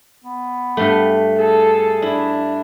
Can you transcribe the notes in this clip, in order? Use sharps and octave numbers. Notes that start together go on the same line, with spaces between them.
B3
G2 A3
G#4 A4
D4 E4